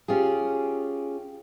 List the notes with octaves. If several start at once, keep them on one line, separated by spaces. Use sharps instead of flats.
C#4 F4 G4 G#4